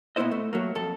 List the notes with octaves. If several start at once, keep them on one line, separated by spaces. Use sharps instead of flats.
A#2 B3 C#4 E4 C5 D#5
A3
F#3 A3 A#3
F2 A4